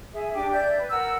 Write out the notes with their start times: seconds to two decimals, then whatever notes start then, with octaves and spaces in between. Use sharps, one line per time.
0.13 G#4 E5
0.34 D4 G4 G5 D6
0.53 D5 E5 G6
0.78 B4
0.90 A#4 F#5 E6